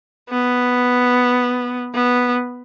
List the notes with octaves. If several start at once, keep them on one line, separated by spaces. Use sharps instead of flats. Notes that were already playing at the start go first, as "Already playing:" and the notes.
B3
B3